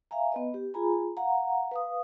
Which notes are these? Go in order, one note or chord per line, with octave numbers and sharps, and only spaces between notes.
E5 F5 G#5 A#5
B3 B4 D#5
G4
F4 G#4 G#5 A#5 B5
F5 F#5 A#5
B4 F5 D#6